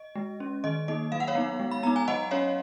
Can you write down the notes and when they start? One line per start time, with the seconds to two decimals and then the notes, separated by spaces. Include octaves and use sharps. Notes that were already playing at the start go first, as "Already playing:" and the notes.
Already playing: D#5
0.16 G#3
0.40 C#4
0.64 D#3 D#5
0.88 A#3 D#4 D#5
1.12 F#3 F5
1.20 F#5
1.27 C#5 F5
1.35 B3 D#4
1.60 G#3
1.71 B5
1.83 B3 D#4 A#5
1.96 G#5
2.08 F#3 D#5 F#5
2.31 C#4 C#5 F5